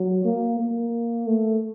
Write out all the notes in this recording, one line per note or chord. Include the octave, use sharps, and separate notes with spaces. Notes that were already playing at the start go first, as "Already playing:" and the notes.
Already playing: F#3
A#3
A#3
A3